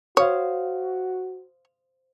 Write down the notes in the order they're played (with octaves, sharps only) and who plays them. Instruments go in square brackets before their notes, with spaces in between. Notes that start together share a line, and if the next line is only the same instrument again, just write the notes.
[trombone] F#4 [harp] C5 F5 D#6 [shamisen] C#5